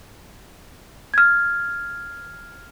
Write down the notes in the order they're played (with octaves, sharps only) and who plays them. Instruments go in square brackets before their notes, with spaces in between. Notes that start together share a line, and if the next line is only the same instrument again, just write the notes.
[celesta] F6 G#6